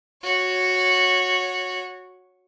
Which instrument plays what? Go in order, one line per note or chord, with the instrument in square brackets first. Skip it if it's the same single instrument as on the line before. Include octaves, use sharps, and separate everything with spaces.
[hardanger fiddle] F#4 C#5